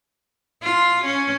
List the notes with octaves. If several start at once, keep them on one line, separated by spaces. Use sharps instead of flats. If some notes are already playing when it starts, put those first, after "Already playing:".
F4
C#4